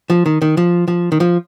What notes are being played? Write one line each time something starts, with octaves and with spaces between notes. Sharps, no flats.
F3
D#3
D#3
F3
F3
D#3
F3